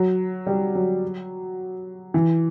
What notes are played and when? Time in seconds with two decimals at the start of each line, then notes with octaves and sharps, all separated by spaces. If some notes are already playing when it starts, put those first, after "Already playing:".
Already playing: F#3
0.47 G3
0.75 F#3
2.14 E3